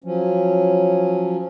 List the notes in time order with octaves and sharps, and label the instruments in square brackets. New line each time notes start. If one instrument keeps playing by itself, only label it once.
[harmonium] F3 F#3 C#4